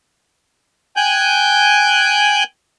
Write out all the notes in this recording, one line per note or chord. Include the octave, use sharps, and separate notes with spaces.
G5 G#5 F#6 G6